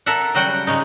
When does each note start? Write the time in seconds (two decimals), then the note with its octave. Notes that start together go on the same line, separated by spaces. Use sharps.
0.06 A4 A#4 E5 F#5
0.35 C#3 F#3 G3 F#4 F#5 G5
0.67 C#3 G#3 C#4 D#4